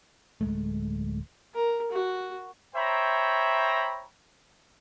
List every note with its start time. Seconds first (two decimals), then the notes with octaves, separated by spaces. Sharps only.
0.41 D1 G#3 A3
1.54 A#4
1.92 F#4
2.75 C5 C#5 E5 G5 A#5 B5